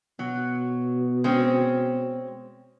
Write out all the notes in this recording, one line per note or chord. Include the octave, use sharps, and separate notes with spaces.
B2 F#3
G#3 C4 C#4